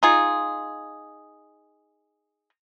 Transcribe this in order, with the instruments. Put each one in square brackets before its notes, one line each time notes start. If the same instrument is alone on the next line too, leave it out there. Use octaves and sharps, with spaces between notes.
[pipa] D#4 F4 G#4